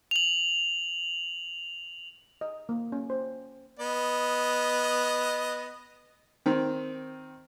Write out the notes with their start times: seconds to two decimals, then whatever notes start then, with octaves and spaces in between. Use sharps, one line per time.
0.11 F7 F#7
2.41 D#5
2.69 A#3
2.92 C#4
3.10 C5
3.79 B3 D#5
6.46 D#3 C4